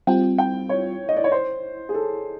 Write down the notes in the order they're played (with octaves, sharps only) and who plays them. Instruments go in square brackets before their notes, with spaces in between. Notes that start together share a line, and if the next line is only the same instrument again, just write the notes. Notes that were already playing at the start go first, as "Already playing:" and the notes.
[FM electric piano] G3 C4 F4 [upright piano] G5
[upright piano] G5
C#5
D#5
D5
C#5
C5
G#4
A4